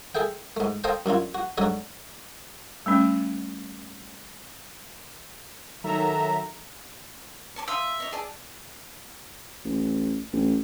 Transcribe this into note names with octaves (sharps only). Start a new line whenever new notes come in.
G#4 A4 E5 G5
G#2 A3
A4 C5 D#5 F5 G5 A5
F#2 D4 E4 F4
F#4
G#2 D3 F#3 F#4 C#5
G3 A3 C#4
D#3 F#3 A4 E5 A#5
C#5 A5 D6
E5 F5 C6 D#6
C#5 D#5
G#4 D5 A5
A1
A1